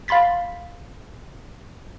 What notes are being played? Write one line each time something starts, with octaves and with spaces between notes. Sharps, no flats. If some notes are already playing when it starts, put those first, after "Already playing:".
F5 B5 C6 A6 B6